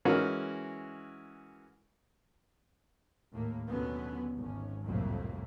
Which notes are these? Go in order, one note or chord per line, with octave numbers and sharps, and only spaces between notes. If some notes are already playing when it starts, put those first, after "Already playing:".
E3 G#3 C#4 F#4 A#4
D#2 A2 A#3
D#2 B2 D3 F#3 B3 C#4
G#1 C#4
C2 F2 A2 F#3 A3 A#3